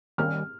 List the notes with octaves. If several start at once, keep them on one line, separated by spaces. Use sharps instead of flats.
D#3 G3 A#3 C#4 F6